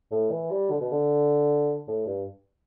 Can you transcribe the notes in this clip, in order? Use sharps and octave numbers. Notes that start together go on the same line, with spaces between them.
A2
E3
G3
D3
B2
D3
A2
G2